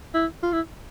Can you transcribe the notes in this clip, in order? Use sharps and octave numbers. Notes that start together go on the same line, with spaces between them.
E4
F4
E4